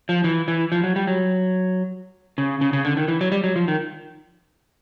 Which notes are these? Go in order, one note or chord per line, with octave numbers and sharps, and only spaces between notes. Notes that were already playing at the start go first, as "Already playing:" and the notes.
F3
E3
E3
F3
F#3
G3
F#3
C#3
C#3
C#3
D3
D#3
E3
F#3
G3
F#3
F3
D#3